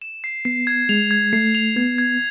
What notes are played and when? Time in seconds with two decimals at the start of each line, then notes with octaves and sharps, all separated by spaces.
0.02 E7
0.24 C7
0.45 B3 C7
0.67 G#6
0.89 G#3 F7
1.11 G#6
1.33 A3 C7
1.55 F7
1.76 B3 G#6
1.98 G#6